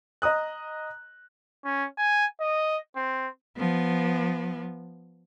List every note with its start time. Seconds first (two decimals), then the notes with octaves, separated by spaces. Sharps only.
0.22 D#5 A#5 D#6 F#6
1.65 C#4
1.98 G#5
2.40 D#5
2.96 C4
3.57 F3 B3